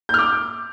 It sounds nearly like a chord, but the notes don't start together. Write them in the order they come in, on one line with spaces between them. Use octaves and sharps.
G6 F6 D6